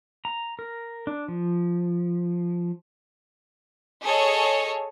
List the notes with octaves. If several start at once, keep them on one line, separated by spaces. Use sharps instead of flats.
A#5
A#4
D4
F3
G#4 A4 C#5 D#5